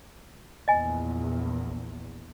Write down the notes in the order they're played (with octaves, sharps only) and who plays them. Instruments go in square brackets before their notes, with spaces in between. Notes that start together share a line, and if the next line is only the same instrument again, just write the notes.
[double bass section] A#1 E2 [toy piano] D#5 G#5